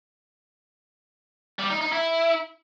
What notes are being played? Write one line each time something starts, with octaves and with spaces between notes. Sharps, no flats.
G3
D#4
D#4
E4